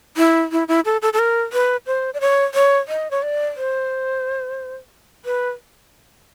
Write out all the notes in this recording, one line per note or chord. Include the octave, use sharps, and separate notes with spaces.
E4
E4
E4
A4
A4
A4
A#4
B4
C5
D5
C#5
C#5
D#5
C#5
D5
C5
B4